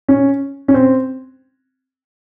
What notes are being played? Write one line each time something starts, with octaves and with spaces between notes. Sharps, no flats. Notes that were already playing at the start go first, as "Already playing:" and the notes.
C#4
C#4
C4